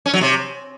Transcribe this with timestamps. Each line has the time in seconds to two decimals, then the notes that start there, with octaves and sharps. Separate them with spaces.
0.06 C#4
0.13 F#3
0.21 C3